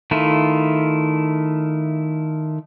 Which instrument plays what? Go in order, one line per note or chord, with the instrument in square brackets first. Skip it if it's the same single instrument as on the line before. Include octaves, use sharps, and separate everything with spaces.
[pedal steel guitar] D#3 A3 E4 F4